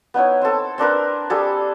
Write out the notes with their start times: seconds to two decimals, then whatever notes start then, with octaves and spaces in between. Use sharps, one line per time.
0.14 B3 D#4 E4 C#5
0.41 C4 A4
0.78 C4 D4 A#4 B4
1.30 G3 G#4 A4